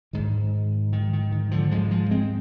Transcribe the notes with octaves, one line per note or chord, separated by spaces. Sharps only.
G#2 D#3
D#3
D#3
D#3
D3 F3
G#2 F3 G#3
F3 G#3
G#3 C4